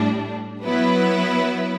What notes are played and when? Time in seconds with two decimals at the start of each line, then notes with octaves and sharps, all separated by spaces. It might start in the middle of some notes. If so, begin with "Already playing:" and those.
Already playing: A2 G3 D4
0.64 F#3 B3 E4 B4